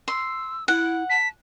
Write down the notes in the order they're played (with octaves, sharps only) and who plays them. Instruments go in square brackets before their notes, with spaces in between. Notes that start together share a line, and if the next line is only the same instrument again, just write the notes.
[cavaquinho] C6 [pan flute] E6
[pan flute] E4 [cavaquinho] F#5
[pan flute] A5 [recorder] B6